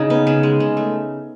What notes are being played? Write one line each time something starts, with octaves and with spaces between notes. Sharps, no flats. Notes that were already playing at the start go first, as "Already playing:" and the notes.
Already playing: C#3 D#4
B3
C#3
G#3
C#3
A3